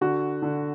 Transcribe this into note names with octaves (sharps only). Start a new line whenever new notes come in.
D3 F#4
D3